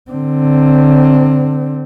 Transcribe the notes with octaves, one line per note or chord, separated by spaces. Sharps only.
D3 C4